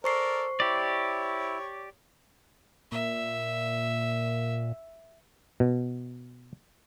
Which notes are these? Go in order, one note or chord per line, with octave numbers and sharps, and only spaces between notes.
A4 A#4 C5 D5 C#6 C7
E4 G4 C#5 D5
A#2 E5
B2